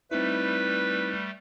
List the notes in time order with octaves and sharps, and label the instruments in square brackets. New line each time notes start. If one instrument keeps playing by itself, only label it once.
[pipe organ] G3 A3 [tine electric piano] C4 D#4 E4 [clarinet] B4